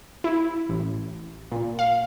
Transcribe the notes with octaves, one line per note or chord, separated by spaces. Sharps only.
E4
A1
A#2
F5